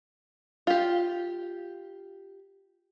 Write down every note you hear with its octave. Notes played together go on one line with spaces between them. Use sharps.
F4 G4